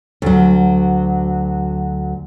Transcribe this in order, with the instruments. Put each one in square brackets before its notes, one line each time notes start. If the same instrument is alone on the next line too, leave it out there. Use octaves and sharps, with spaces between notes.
[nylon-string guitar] D2 F#3